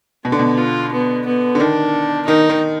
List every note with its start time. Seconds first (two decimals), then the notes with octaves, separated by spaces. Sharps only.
0.24 B2 B3
0.32 D3
0.39 B2
0.58 F4
0.93 B3
1.26 B3
1.55 D3
1.60 D#3 D4
2.27 D#3 D#4
2.49 D#3